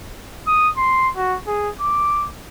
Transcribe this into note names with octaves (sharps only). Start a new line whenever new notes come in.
D#6
C6
F#4
G#4
D6